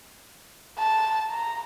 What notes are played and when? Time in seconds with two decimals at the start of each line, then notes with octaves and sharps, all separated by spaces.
0.78 A5
1.30 A#5